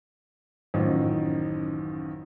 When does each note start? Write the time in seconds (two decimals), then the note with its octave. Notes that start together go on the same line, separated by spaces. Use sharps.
0.74 A1 F#2 D#3 F3